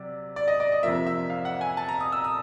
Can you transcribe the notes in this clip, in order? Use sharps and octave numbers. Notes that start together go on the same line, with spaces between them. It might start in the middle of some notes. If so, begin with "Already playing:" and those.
Already playing: C3 F#3 D5
D5
D#5
D5
D#5
F2 C3 F3 A#3 E5
E5
F5
F#5
G#5
A5
A#5
D#6
E6
D#6